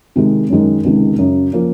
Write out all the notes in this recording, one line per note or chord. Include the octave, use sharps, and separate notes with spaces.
C3 D#3 G#3
F#2 D#3 G#3
C#2 C3 D#3 G#3
F#2 C#3 F#3
F3 A#3 C#4